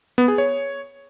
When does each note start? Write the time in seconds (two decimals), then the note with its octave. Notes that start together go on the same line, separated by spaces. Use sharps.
0.18 B3
0.28 G#4
0.38 C#5